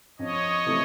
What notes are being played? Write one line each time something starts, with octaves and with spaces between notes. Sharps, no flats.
F2 C#5 D#5
C3 E3 A3